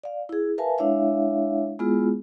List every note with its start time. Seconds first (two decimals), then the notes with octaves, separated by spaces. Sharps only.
0.04 D5 F5
0.29 E4 G#4
0.58 A#4 B4 E5 F5 G#5 A5
0.78 G#3 D4 E4 C#5 E5 F5
1.79 G#3 B3 E4 F4 G#4